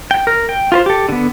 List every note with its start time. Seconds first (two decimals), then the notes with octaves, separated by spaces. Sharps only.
0.11 G5
0.27 A#4
0.49 G5
0.72 F4 B4 C5
0.86 G4 A4
1.09 D3 B3